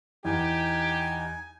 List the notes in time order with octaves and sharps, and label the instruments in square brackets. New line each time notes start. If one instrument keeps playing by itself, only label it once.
[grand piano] E2 [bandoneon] D#4 [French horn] G4 [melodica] G#5